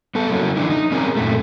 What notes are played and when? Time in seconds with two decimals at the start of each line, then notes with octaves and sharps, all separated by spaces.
0.15 B3 A4
0.30 F#3 A#3 C#4 E4
0.57 D3 E3 A#3 D4 E4
0.70 D#4
0.92 C4 C#4 G#4 A#4
1.17 F#2 A#2 A3